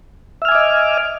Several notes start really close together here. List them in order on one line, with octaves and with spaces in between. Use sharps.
E5 F6 G#5 D6 D#5